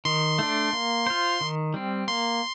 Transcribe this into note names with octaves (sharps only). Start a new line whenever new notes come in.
D#3 C6
A3 D4
A#3
F4 C5
D#3
G3 C4
A#3 C6